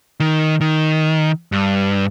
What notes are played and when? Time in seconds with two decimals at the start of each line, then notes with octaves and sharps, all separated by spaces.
0.20 D#3
0.61 D#3
1.52 G2